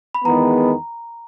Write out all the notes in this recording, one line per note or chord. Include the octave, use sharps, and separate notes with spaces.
B5
E2 D#3 G#3 B3 A#5